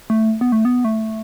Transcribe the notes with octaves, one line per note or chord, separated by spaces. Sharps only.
A3
B3
A3
B3
A3